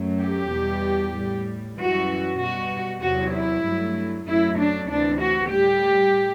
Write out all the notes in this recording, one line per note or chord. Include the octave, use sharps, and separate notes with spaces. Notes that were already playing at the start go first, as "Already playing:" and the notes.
Already playing: F#2 F#3 A3
G4
E2 B2 G3
A2 G3
F#2 E3 G3 F#4
B2 G3 F#4
E2 C3 F#3 F#4
E4
G2 F#3 A3
F#2 F#3 A3 E4
D4
D2 C3 E3 D4
F#4
A2 G3 G4